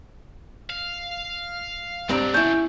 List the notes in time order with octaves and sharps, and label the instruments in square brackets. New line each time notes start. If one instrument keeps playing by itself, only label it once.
[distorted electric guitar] F5
[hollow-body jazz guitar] G2 C4 A#5 [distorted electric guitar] B2 D4
[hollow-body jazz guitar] C#4 E4 [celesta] G6